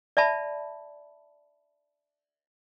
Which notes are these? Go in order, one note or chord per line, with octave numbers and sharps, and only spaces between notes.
D5 E5 A5 B5